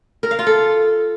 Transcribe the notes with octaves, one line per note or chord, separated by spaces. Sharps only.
A#4
F5
F4
A4